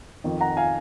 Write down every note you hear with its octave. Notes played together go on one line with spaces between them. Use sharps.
F2 D#3
F#5 A#5
F5 G#5